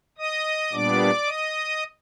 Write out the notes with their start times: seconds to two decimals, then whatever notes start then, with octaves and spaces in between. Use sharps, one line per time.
0.18 D#5 D#6
0.72 A#2 G3 B3 D4 D5 D6
1.26 D#5 D#6